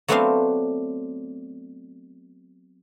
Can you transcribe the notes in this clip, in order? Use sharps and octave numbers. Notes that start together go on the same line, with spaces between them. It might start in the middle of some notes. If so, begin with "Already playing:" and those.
F#3 A3 B3 C4 D4 F5